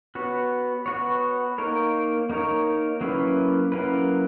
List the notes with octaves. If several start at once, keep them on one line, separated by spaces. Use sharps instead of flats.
B3 F#4 C#5
B3 F#4 C#5
A#3 D#4 A#4 C#5
A#3 D#4 A#4 C#5
F#3 A#3 C#4 E4 B4
F#3 A#3 C#4 E4 B4